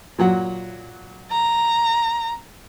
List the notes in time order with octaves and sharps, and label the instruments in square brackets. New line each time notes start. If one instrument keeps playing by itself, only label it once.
[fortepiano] A#2 F#3 F#5
[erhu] A#5